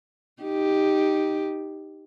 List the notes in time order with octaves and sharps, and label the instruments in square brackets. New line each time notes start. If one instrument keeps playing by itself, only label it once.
[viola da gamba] D#4 G4